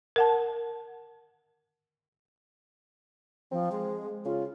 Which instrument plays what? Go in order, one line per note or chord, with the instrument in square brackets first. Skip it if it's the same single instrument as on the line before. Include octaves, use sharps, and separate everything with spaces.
[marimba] A#4 F#5 A5
[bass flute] F3 [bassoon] C4
[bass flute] G#3
[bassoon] C#3 [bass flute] F4